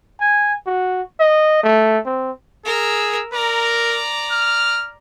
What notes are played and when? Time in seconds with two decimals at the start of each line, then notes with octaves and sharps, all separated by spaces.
0.20 G#5
0.66 F#4
1.20 D#5
1.63 A3
2.05 C4
2.65 G#4 A#4 E6
3.33 A#4 D5 A#5
4.32 F6